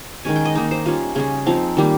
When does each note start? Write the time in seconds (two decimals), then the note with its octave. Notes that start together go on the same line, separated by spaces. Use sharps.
0.25 D#3 G#3 C#4 G#5
0.36 G5
0.45 D#5
0.55 D#3 A#3 D#4
0.71 C5
0.86 G3 C#4 F4
1.15 C#3 G3 C#4 G#4
1.46 F3 C4 D#4 F5
1.77 D#3 G3 A#3